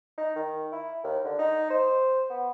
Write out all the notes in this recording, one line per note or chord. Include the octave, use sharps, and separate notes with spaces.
D#4
D#3
E4
D#2
D3
D#4
C5
B3